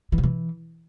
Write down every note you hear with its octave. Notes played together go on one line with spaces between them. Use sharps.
E3
C3
E3